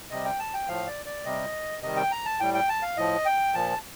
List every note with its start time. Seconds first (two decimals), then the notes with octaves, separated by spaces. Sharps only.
0.11 C3 G3 D#5
0.25 G5
0.39 A5
0.54 G5
0.68 A2 F3 F5
0.87 D5
1.06 D5
1.25 C3 G3 D#5
1.82 C3 D#3 G3 D#5
1.97 G5
2.11 A#5
2.25 A5
2.40 A2 G3 G5
2.54 G5
2.69 A5
2.83 F5
2.97 A2 F3 D#5
3.25 G5
3.54 A#2 F3 A5